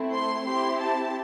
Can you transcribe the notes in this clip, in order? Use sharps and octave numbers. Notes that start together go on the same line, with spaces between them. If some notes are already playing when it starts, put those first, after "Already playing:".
Already playing: A3 C4 E4
C6
C4 E4 G4 C6
A5